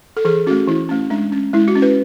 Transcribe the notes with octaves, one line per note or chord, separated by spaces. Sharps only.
A4
E3 G#4
A3 C#4 F#4
E3 E4
A3 C#4
G#3 D4
C#4
G#3 E4
F#4
C#4
B4